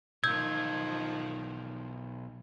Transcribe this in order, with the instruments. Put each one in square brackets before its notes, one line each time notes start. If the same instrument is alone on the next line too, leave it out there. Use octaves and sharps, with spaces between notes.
[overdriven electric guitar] B1 F4 [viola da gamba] D#3 F3 [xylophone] E6 G6 [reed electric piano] G#6